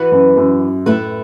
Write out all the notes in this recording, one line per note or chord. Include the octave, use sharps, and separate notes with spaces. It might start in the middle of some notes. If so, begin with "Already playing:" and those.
Already playing: E3 B3 F#4 B4
F#2
F#2
A2 A3 E4 B4